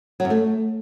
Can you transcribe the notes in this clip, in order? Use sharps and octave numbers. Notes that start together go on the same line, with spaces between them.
F#3
F#2
A3